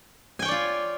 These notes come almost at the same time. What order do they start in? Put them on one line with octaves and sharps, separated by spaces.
G#5 G5 C#5 D5 F4